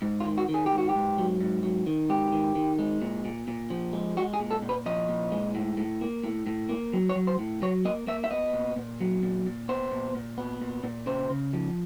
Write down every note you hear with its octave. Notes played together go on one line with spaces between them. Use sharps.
G#2
F4
D#3
F#4
D#3
G#4
G4
G#2
F#4
G4
G#2
F#3
G#2
F#3
D#3
G#2 G4
D#3
D#3
G#3
A#2
A#2
A#2
F3
G#3
G#3 F#4
G#4
A#2
A4
A#2
B4
F3 D#5
A#2
G#3
A2
A2
A#3
A2
A2
A#3
F#3
C#5
F#3
C5
A2
F#3 C#5
A#3 D#5
A#3 E5
E5
B3 D#5
A#2
A#2
F#3
A#2
A#2
B3 C5
A#2
A#2
B3
A#2
A#2
C#3 C5
C#3
F3